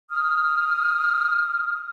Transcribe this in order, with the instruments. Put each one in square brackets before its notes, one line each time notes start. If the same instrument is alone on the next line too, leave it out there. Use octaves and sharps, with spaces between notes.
[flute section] D#6 F6